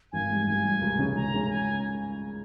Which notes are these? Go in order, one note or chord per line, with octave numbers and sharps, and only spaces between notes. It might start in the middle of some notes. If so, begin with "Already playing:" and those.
G#1 G#5
G#2 G3
G#1 G#5
G#2 G3
C#2
C#3 G#3 C#4
C#2 A#5
C#3 G#3 C#4
G#5